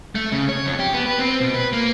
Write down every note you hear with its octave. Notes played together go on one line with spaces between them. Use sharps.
A3
C#3
C#5
F2
G4
B3
B4
C4
B2
B4
A#3